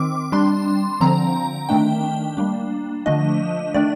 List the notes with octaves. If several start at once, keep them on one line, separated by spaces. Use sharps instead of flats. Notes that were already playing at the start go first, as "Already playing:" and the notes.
Already playing: D#3 C4 D6
G3 D4 C6
D3 F3 C4 A#5
D#3 A3 D4 G5
G3 A#3 D4
D3 F3 A3 D4 D#5
D#3 A3 D4 D5